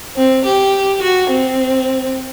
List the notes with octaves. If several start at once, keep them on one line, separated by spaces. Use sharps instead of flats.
C4
G4
F#4
C4